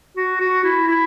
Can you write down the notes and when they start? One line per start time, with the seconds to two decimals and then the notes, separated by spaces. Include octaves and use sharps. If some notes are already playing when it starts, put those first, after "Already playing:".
0.17 F#4
0.40 F#4
0.64 E4
0.88 E4